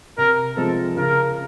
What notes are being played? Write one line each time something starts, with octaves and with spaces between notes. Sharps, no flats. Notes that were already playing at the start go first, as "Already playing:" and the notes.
C3 A#4
F3 G#3 C4 A4
C#3 A#4